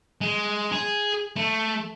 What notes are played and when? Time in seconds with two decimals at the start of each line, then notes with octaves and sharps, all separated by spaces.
0.21 G#3
0.72 G#4
1.36 A3